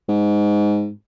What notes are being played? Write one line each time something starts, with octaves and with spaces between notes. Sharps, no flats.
G#2